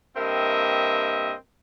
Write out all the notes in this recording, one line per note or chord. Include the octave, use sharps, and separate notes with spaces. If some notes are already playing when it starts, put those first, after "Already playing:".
G2 A#3 C4 A#4 D#5 E5